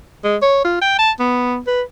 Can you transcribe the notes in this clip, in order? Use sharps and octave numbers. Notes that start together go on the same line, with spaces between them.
G#3
C#5
F4
G5
A5
B3
B4